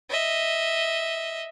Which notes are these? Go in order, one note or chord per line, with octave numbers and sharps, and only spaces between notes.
D#5 E5